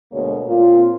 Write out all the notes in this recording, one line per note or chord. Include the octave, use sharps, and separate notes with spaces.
D2 B2 G#3 A#3 C#5
A#2 C4 F4